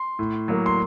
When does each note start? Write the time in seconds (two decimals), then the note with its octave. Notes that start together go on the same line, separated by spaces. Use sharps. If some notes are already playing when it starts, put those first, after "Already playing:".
Already playing: C6
0.19 A2
0.48 F#3 A#3
0.66 C6